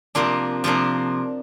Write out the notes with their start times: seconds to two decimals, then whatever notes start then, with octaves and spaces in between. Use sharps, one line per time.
0.15 C3 F3 A#3 D4 F4
0.64 C3 F3 A#3 D4 F4